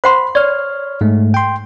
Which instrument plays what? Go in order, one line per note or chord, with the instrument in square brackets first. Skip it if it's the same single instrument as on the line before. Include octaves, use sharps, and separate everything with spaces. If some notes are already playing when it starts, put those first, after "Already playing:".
[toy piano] C5 F#5 C6 [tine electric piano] B5
[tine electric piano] C#5 F6 [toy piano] D5
[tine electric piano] G#2 G#3 A3
G5 C6